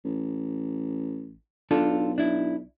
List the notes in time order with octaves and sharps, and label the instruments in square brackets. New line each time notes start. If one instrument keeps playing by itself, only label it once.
[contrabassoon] A1
[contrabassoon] B1 [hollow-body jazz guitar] D4 F4 A4
[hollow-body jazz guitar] D4 E4